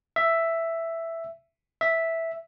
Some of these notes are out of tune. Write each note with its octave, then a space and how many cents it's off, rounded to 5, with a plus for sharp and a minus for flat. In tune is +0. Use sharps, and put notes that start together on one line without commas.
E5 +5
E5 -5